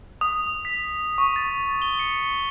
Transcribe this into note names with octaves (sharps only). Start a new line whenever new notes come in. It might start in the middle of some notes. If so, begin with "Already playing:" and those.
D#6
B6
C#6
A6
G7
C#7